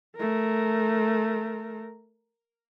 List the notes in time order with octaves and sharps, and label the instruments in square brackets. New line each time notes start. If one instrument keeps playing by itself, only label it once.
[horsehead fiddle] A3 A#4